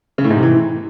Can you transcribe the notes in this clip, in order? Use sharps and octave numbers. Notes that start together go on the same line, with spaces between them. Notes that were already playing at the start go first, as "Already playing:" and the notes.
C#3
A2
G#2
C3
E3